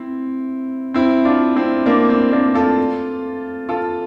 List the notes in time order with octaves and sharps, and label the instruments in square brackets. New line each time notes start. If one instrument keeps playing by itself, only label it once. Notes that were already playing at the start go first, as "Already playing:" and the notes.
Already playing: [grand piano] C4 E4
C4 E4
D4 F4
C4 E4
A#3 D4
C4
A#3 D4
F4 A4
F4 A4